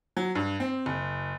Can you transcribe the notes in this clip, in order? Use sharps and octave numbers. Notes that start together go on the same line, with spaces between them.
F#3
G2
C4
F#1